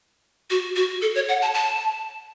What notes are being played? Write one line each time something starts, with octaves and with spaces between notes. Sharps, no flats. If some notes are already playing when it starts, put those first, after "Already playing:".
F#4
F#4
A4
C#5
F#5
A5
A5